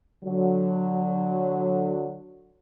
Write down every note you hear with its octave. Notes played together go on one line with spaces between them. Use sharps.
D3 F#3